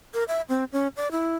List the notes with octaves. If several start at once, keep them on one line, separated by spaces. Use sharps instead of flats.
A#4
E5
C4
C#4
D5
E4